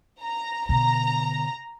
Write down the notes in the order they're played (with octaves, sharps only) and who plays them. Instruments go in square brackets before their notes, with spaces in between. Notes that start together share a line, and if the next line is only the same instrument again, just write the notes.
[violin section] A#5
[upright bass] B2 D3 [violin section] A#5